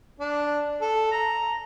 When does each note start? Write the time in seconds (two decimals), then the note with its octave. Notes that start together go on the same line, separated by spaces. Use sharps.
0.20 D4
0.81 A4
1.12 A#5